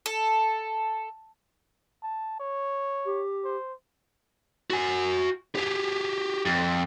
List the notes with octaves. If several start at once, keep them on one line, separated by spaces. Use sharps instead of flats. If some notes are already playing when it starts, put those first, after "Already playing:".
A4
A5
C#5
G4
C5
F#4 G#5
G4 G#4
F2